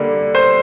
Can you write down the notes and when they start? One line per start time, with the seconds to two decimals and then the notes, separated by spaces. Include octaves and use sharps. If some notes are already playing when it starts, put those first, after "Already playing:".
Already playing: D3 G3 A#3
0.35 C5